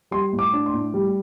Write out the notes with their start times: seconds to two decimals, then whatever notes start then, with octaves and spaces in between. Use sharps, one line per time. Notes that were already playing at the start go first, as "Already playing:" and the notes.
0.11 G3 C6
0.33 A2
0.39 D6
0.53 D4
0.66 C6
0.74 A2
0.94 G3